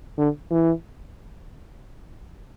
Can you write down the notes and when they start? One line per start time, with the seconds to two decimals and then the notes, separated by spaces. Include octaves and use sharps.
0.18 D3
0.51 E3